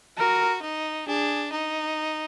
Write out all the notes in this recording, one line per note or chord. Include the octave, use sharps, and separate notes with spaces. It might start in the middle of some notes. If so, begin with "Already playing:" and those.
F#4 A#4
D#4
D4 G#4
D#4